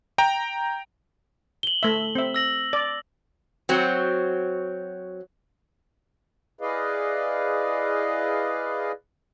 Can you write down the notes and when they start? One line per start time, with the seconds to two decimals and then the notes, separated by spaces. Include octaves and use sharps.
0.18 G5 A#5
1.63 F#7 G7
1.83 A3 E5
2.15 C4 E5
2.34 E6 A#6 F#7
2.73 D5
3.69 F#3 C4 F#4
6.61 E4 G#4 B4 D5 D#5 F5